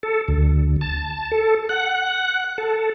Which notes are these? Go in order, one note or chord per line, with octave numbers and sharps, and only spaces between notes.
A4
D2
A5
A4
F#5
A4